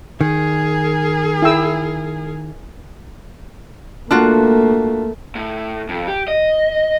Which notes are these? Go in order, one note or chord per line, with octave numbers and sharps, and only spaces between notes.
D#3 G#4 A#4
E4 G5 E6
A3 A#3 D4 F4 F#4
A2
F2
G4
D#5